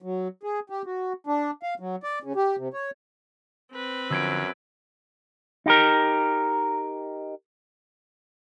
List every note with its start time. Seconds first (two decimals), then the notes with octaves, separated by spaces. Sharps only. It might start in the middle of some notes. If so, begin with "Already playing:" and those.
0.02 F#3
0.43 G#4
0.70 G4
0.86 F#4
1.27 D4
1.63 F5
1.80 F#3
2.03 D5
2.23 C#3
2.36 G4
2.57 C3
2.74 C#5
3.73 C4 B4
4.11 F#2 D3 F3 E6 G#6 D7
5.66 D#4 G4 A#4